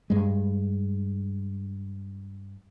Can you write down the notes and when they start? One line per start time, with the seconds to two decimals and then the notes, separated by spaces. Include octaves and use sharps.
0.10 G2 G#3